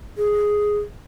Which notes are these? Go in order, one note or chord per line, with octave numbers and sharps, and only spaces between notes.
G#4